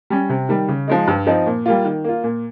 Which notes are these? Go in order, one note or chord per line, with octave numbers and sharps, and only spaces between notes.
G3 C#4
C3
D#3 G3
C#3
F3 G#3 D#4
G2
F3 C4 D#4
A#2
G3 A#3 F4
D#3
A#3 F4
A#2